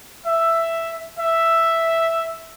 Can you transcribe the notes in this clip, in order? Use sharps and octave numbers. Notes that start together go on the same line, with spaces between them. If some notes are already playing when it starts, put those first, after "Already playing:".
E5
E5